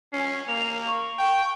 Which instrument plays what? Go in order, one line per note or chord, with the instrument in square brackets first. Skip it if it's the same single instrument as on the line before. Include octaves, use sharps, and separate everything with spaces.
[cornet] C#4 [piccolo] C7
[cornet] A#3 [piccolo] F7
[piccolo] C#6
[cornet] G5